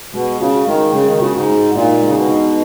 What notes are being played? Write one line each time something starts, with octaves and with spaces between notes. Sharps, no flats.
B2 G#3
C#3 F#4
D#3 G#3
C#3 G#3
D#3
C#3 F#4
G#2
G#3
A#2 D#4
G#3
C#3
B2
D#4